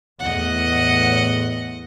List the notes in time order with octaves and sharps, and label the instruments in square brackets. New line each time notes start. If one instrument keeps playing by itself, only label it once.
[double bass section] E2 A2 [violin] D#5 F#5